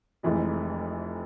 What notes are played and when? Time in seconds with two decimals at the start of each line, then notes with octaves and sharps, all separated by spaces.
0.23 F1 F2 E3 G#3